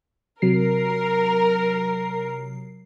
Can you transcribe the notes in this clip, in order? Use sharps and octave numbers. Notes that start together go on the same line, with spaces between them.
C3 F#3 A#4 C7